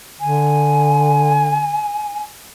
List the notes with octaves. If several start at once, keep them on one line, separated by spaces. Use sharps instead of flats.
D3 G#5